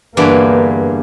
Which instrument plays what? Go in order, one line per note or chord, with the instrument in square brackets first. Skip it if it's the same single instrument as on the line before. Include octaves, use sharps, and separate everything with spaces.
[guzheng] E2 G2 F#5 [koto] D3 E3 [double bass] A#3